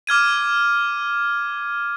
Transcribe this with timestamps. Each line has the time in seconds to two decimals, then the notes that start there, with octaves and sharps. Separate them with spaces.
0.07 D6 F6 G#6 D#7